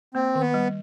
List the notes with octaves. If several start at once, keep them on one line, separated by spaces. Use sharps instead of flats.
A#3 C4
D#3
B3
G3